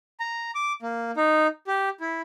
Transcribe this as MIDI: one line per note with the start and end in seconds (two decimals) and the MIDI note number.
0.20 0.51 82
0.55 0.73 86
0.82 1.11 58
1.17 1.47 63
1.67 1.89 67
2.01 2.22 64